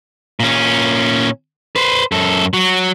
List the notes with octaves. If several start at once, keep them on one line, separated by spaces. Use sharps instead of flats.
A#2 C#4
B4 C5
F#2 A4
F#3